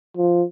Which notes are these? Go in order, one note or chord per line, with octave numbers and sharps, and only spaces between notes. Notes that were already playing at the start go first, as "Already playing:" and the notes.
F3